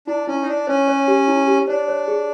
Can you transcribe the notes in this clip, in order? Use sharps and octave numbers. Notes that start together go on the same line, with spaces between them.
D4 E4
C#4 E4
D#4
D4 E4
C#4 C#5
C#5
G4
E4
G4
D4 C#5
C#5
G#4